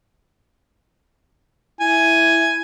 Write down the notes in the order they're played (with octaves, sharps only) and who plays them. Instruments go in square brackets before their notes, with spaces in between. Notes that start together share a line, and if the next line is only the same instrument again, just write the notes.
[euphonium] E4 [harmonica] G#5